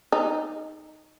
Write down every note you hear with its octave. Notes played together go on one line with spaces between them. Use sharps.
D#4